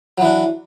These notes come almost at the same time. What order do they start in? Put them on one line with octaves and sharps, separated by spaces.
F#3 E3 D4